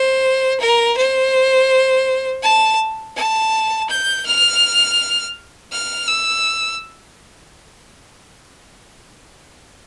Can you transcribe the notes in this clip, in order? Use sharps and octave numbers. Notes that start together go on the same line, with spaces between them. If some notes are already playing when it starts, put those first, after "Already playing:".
Already playing: C5
A#4
C5
A5
A5
G6
F6
F6
E6